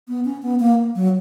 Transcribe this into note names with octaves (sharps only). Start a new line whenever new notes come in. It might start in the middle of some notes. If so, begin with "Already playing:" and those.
B3
C#4
B3
A#3
F#3